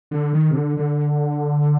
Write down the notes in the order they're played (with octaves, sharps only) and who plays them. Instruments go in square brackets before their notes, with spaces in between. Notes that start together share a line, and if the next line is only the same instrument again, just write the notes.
[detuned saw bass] D3
D#3
C3
D3
D3